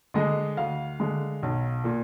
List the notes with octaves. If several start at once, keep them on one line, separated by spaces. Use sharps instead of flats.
D3 G#3 D#5
D2 F5
D3 G#3
B1
A#2